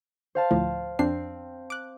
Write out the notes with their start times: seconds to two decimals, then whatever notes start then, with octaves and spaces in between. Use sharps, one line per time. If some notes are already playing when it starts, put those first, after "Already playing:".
0.35 C5 F5 A5
0.51 D2 A2 F3
0.99 F2 C4 D4 C7
1.70 D6 F#6